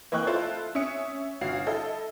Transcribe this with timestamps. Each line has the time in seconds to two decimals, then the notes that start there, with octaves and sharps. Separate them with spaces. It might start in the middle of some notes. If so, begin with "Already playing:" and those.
0.12 E3 A#3 D#5 G5 C#6 F#6
0.27 E4 F4 A4 C5
0.75 C#4 E5 D#6 C#7
1.41 G1 F#4 F5 F6 C7
1.66 E4 A4 D#5